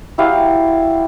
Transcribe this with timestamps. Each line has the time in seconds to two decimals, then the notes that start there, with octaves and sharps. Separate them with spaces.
0.18 F#3 E4 G4 F5